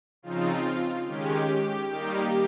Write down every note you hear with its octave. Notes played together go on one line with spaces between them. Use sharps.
C#3 F3 C4 D#4 F4
D#3 G#3 C#4 G4
D#3 G3 A#3 D#4